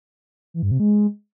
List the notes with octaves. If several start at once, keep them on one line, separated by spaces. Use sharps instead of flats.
E3
G2
C3
G#3